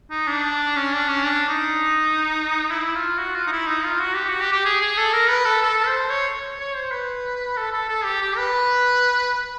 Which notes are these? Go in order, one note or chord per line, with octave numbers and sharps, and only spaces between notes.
D#4
D4
C#4
D4
C#4
D4
D#4
E4
F4
F#4
F4
D#4
E4
D#4
F4
F#4
G4
F#4
G4
G4
G#4
G#4
A4
A#4
B4
A4
A4
C5
C#5
C#5
C5
B4
A4
A4
A4
G4
G4
B4